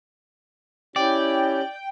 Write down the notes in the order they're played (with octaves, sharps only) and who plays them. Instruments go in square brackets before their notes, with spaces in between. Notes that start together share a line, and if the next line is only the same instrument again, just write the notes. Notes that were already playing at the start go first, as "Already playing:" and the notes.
[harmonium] C#4 G4 [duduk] E4 [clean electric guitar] D5 [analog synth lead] G5